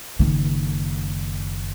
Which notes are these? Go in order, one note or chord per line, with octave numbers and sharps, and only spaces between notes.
F#1 D#3